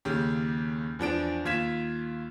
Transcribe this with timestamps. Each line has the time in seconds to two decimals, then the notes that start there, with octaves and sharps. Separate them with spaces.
0.05 D#2 C#3 G4
0.99 E2 F3 D4 D7
1.45 D#2 F4 G#6 B6 E7